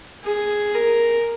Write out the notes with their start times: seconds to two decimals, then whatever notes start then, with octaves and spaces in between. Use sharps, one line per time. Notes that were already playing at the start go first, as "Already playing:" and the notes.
0.25 G#4
0.75 A#4